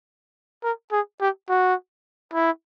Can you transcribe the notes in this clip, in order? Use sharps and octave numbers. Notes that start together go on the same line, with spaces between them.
A#4
G#4
G4
F#4
E4